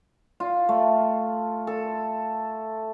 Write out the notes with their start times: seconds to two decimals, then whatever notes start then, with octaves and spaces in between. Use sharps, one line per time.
0.40 F4
0.69 A3
1.67 A4